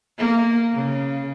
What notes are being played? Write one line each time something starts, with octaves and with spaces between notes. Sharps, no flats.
A#3
C#3